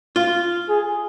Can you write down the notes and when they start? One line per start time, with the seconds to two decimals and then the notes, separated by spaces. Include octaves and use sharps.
0.16 F4
0.69 G#4